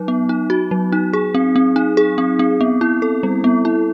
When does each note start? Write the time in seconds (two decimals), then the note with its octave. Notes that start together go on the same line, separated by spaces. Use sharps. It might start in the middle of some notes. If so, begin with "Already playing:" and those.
Already playing: F#3 D#4
0.08 B3
0.29 D#4
0.50 F#4
0.71 F#3
0.92 D#4
1.13 G#4
1.35 C4
1.56 C4
1.76 D#4
1.97 G#4
2.18 C4
2.39 C4
2.61 B3
2.81 E4
3.02 A4
3.23 G3
3.44 B3
3.65 E4